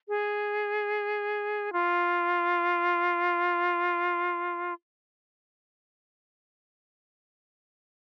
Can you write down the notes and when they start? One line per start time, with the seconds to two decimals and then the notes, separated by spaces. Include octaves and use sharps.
0.08 G#4
1.73 F4